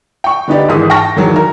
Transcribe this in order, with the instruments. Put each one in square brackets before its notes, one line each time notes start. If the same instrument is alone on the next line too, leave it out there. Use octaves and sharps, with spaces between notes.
[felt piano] G5 C#6
D3 B3 D#4 G4 D5
G#1 G#2 E3 D#6
G5 A5 C#6 F6 A#6
E2 D#3 F#3
D#3 A#4